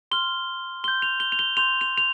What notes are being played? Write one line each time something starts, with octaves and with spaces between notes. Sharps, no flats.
C6 F6 G7
C6 G6 G7
F7
G7
F7
G7
C6 G6 F7
F7
F7